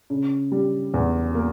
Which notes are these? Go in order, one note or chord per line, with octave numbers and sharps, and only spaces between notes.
C#3
G3
E2
A#3